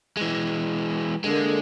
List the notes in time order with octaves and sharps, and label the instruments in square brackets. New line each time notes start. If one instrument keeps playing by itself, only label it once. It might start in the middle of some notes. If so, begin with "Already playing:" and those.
[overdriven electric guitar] E3 G#3
[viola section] D3 A#3 [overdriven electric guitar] G#3